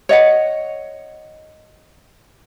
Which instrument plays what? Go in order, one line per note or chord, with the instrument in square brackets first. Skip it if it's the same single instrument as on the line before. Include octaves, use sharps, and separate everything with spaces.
[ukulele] C#5 D#5 F#5